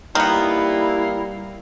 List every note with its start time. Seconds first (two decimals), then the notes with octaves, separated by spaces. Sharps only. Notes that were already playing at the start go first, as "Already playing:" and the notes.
0.15 D#3 G3 A#3 B3 E4